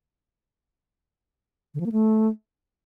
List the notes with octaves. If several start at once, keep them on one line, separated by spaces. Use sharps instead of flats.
D3
F3
A#3
A3